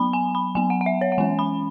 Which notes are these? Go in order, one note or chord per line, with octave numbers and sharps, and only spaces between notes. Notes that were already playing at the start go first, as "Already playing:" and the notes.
Already playing: F#3 B3 B5
G#5
B5
F#3 B3 G#5
F#5
F#5
E5
C#5
F#5
E3 G#3 C#4 G#5
B5